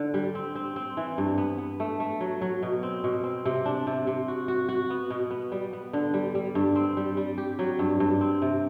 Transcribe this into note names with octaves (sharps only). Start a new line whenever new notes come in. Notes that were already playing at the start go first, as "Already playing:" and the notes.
Already playing: D3
G3
C4
C4
C4
E3
G2
B3
B3
A3
A3
F#3
F#3
B2
C4
B2
C4
C3
D4
C3
C3
F#4
F#4
F#4
B3
B2
B3
G3
B3
D3
G3
G3
G2
C4
G3
G3
G4
F#3
G2
G2
C4
C3